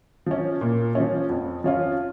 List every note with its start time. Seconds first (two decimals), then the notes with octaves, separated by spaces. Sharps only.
0.26 F3 C#4
0.61 A#2
0.95 F3 C#4
1.30 F2
1.64 F3 C#4 F4